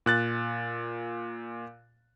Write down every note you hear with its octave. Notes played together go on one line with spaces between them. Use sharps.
A#2 F#6 A6